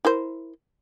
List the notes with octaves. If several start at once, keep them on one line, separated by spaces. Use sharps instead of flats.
E4 A#4 C5